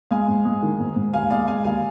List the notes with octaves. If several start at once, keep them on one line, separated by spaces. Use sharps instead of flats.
G#3 F5 G#5
G#2
G#3
D#3
G#2
G#2
D#2 F5 G#5
G#3 D5 F5
G#3 F5 G#5
D#2 F5 G#5